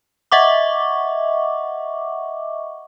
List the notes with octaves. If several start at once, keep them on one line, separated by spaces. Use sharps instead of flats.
D#5 E5 F#5 C#6 D6